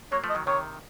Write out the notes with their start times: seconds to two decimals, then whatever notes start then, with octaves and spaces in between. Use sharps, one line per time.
0.12 F#3 A#3 C#5
0.24 F3 A3
0.30 D#5
0.35 D#3 F#3
0.47 C3 D#3 C#5